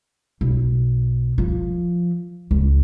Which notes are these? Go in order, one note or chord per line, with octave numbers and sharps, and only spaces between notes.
B1
F3
C#2